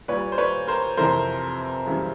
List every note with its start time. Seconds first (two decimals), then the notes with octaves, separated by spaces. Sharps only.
0.08 A#2 G3 B4 C#5
0.32 C5
0.38 B4 C#5
0.68 A#4 C5
0.97 F2 C3 E3 A#4 C5
1.86 F#2 C#3 E3 G3